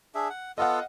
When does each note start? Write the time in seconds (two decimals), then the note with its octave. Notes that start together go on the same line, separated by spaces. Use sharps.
0.15 D4 G#4 E5
0.30 F#5
0.58 B3 F4 A4 D#5 F5 F#5